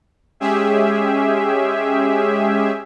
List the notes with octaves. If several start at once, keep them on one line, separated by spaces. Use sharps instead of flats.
G#3 C#4 G4 G#4 E5